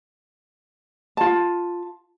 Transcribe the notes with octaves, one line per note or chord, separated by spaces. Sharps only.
F4 A5